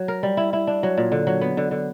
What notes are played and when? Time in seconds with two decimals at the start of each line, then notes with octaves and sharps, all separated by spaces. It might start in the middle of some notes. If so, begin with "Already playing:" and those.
Already playing: F#3
0.08 A#4
0.23 G3
0.37 E4
0.53 E4
0.67 D4
0.83 F#3
0.98 A#2
1.12 D3
1.27 F#3
1.41 B3
1.57 D3
1.71 D3